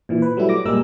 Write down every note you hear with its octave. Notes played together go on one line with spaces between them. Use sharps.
A#2 E3
B4
F#3 G3 A3 E4
D6 A#6
A#2 G3 G#3 A#4 E6